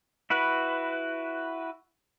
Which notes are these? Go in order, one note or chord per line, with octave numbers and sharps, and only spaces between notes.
E4 F#4 B4